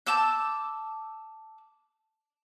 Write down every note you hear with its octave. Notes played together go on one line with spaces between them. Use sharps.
A5 D6 E6 G6